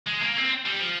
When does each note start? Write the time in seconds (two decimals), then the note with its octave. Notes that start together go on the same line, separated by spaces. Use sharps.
0.07 G#3
0.22 A#3
0.36 C4
0.65 G3
0.80 F3